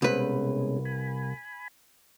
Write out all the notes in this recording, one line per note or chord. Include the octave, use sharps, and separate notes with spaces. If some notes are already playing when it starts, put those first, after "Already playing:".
C2 B2 G#3 C#4 B4
G#5 B5